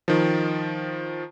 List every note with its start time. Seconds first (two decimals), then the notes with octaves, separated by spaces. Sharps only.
0.08 D#3 F3